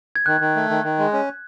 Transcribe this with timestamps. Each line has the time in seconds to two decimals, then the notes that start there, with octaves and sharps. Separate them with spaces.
0.16 G#6
0.26 D#3 F#6
0.41 D#3
0.56 A3
0.70 D#3
0.84 D#3
0.98 G#3
1.13 C#4